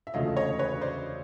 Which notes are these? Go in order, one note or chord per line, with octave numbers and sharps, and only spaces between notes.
E5
E1 D2 C#3 F3 A3 D#5 F5
C#5 D#5
B4 C#5
C5 D5